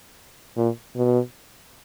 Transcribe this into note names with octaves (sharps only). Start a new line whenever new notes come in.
A#2
B2